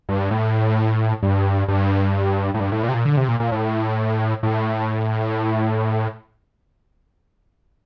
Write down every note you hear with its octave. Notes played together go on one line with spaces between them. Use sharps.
G2
A2
G2
G2
A2
G2
A2
A#2
C3
A#2
D3
C3
A#2
A#2
A2
A2